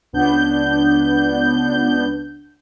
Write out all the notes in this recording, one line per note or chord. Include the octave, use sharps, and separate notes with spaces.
C#2 B3 D4 G6